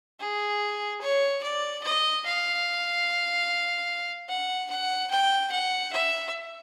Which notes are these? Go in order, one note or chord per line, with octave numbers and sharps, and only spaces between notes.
G#4
C#5
D5
D#5
F5
F#5
F#5
G5
F#5
E5